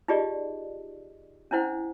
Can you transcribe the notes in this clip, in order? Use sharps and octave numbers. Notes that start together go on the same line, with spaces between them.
D#4 F4 G4 G#4 D5 D#5
C#4 D4 E4 C5 F#5